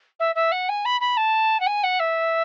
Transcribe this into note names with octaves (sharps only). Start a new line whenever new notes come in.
E5
E5
F#5
G#5
B5
B5
A5
F#5
G#5
F#5
E5